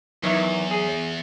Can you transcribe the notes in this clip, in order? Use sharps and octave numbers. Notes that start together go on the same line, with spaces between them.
E2 D#3 E3 F#3 E5
G#4